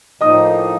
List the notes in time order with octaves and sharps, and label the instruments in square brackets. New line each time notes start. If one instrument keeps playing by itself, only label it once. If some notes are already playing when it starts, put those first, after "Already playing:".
[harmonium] A2 F3 A#3 D#4 [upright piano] D#5 D#6